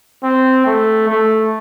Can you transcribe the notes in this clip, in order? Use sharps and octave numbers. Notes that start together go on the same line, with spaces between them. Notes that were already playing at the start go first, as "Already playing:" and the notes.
C4
A3
A3